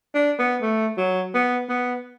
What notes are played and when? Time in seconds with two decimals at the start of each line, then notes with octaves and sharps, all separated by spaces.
0.14 D4
0.39 B3
0.62 A3
0.98 F#3
1.34 B3
1.69 B3